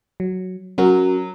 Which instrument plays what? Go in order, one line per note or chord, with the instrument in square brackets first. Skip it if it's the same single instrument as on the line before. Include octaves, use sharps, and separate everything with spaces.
[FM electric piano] F#3
[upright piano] F#3 [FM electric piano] C#4 F#4 A#4